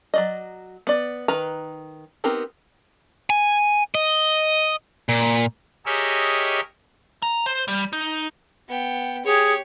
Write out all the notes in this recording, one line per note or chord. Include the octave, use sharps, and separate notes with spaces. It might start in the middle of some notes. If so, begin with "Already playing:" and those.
F#3 D5 D#5
B3 D5
D#3 B4 A#5
B3 C4 D#4 G4 A#4
G#5
D#5
A#2
G4 G#4 A#4 C#5 D#5 E5
A#5
C5
G3
D#4
B3 G5
G4 G#4 C#5